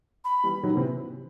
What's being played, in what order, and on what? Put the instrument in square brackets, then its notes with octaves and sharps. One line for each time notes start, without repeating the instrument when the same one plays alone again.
[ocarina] B5
[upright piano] E3 G3
D#3 F#3
C3 E3